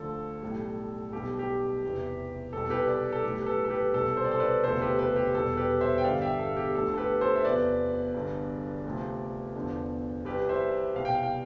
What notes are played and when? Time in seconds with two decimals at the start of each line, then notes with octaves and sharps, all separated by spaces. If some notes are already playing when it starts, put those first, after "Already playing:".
Already playing: D2 D3 F3 A4
0.42 B1 A2 G3
1.12 B1 B2 G3 G4
1.39 G4
1.83 E2 C3 E3
2.53 C2 B2 G3 A4
2.70 G4 B4
2.88 B4 D5
3.12 A4
3.23 B1 A2 G3 G4
3.42 B4
3.46 A4
3.65 A4
3.70 G4 B4
3.93 C2 B2 G3 A4
4.17 C5
4.24 D5
4.31 A4 C5
4.40 B4 D5
4.64 E1 D2 C3 F3 A4 C5
4.82 G4 B4
4.99 G4 B4
5.16 G4
5.34 E1 E2 B2 G3 A4
5.57 G4 B4
5.81 C5 E5
5.98 G5
6.04 G1 G2 D3 G3 D5 F5
6.22 E5 G5
6.39 A4
6.57 G4
6.75 D2 D3 F3 A4
6.94 A4
6.98 G4 B4
7.21 A4 C5
7.36 E5
7.45 E2 C3 F3 B4 D5
8.14 G1 G2 D3
8.85 D2 C3 F3
9.55 E2 D3 F3
10.25 C2 C3 G3 G4 B4
10.49 C5 E5
10.95 C2 B2 G3 F5
11.05 G5
11.15 F5
11.23 G5